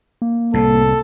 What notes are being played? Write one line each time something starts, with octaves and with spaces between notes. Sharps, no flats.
A#3
C2 A2 A4